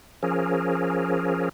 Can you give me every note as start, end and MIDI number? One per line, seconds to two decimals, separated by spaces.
0.23 1.49 53
0.23 1.49 61
0.23 1.49 68
0.23 1.49 70